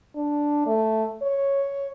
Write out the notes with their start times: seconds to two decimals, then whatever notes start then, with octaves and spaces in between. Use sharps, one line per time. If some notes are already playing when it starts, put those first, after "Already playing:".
0.16 D4
0.66 A3
1.22 C#5